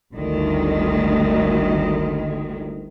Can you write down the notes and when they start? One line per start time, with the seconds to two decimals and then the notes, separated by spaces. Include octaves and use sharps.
0.14 G1 D2 D#3